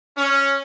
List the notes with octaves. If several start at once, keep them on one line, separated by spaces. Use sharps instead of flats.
C#4